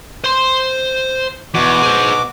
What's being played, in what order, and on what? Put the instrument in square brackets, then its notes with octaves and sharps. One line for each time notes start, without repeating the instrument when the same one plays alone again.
[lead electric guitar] C5 C6
[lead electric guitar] E2 [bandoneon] B2 F#4 D6
[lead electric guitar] G#4 C5